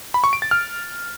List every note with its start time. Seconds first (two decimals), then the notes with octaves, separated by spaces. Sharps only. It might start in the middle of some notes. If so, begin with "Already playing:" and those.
0.14 B5
0.24 C#6
0.33 D7
0.42 A6
0.51 F6